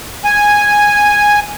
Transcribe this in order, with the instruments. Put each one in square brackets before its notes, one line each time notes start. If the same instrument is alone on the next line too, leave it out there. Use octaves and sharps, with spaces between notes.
[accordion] G#5